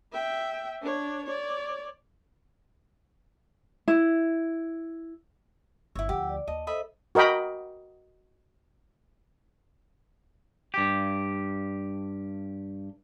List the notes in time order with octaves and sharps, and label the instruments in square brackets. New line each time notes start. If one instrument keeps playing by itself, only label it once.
[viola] E5 G5
D4 C#5
C#5 D5
[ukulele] E4
[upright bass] G1 [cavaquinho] E4 C#5 [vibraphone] E6
[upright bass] D2 F3 [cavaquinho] G4 [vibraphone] F#5 E6
[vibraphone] D5
[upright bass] D#2 [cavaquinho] D#5 [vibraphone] A5
[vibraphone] A4 C5 [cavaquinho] D#5 E5 B5
[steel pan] F#4 A#4 D#5 G5 B5
[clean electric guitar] G2 G4